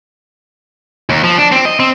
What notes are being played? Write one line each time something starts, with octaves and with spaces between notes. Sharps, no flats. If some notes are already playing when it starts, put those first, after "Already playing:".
D#2
F3
D4
C4
D#5
C4